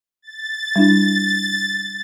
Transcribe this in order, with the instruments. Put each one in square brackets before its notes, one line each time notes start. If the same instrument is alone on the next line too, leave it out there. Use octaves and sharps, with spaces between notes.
[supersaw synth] A6
[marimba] G3 D4 E4